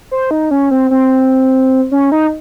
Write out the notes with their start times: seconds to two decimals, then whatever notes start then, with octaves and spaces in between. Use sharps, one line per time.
0.11 C5
0.31 D#4
0.51 C#4
0.71 C4
0.91 C4
1.91 C#4
2.12 D#4